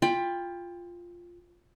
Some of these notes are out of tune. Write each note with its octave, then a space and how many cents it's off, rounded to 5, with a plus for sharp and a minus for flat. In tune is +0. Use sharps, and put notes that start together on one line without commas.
F4 +0 G5 +25 B5 +0